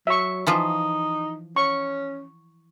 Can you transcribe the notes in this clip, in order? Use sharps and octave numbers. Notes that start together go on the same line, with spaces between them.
F#3 E5 C#6
E3 F3 D#4 F4
C#4 C#6